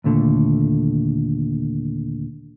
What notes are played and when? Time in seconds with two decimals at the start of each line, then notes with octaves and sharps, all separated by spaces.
0.04 D#2 A#2 D3 A3